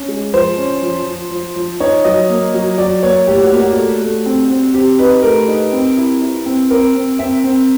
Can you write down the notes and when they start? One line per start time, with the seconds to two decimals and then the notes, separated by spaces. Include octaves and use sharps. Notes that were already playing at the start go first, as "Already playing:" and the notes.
Already playing: C#4
0.08 G#3
0.33 F3 C5
0.58 C#4
0.82 F3
1.07 F3
1.31 F3
1.56 F3
1.80 D#4 C#5
2.05 F#3 D#5
2.30 A#3
2.54 F#3
2.78 F#3 D5
3.03 A#3 C#5
3.27 A2 G4
3.43 F#4
3.52 A#3
3.60 F#4
3.76 A3
4.01 A3
4.26 C4
4.49 C4
4.74 C4 G4
4.99 D#4 B4
5.23 A3 A#4
5.48 D#4
5.72 C4
5.97 E4
6.22 E4
6.46 C4
6.70 C4 A#4
6.95 C4
7.19 C4 E5
7.44 C4